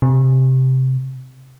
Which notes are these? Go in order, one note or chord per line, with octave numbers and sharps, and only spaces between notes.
C3